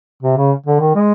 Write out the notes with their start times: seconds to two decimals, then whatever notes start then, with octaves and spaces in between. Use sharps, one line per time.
0.23 C3
0.37 C#3
0.66 D3
0.80 D#3
0.95 G#3